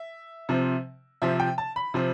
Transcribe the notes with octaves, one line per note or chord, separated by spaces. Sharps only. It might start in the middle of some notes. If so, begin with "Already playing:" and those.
Already playing: E5
C3 F3 C4
C3 F3 C4 E5
G5
A5
B5
C3 F3 C4